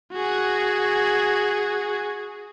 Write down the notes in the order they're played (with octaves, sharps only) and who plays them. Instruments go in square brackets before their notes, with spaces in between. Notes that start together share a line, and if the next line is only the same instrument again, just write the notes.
[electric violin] F#4 G#4